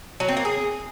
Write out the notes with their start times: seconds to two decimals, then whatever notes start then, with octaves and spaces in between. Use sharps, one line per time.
0.20 F#3
0.28 C4
0.37 A#3
0.45 G#4